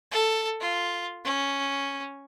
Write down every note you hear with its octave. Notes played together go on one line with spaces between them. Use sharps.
A4
F4
C#4